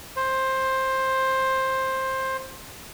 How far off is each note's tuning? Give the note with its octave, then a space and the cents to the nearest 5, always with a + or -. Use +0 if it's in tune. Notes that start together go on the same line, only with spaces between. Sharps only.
C5 +15